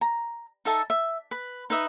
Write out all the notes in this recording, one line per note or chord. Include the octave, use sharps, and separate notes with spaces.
A#5
D#4 A4 E5 A5
E5
B4 B5
D#4 B4 E5 D#6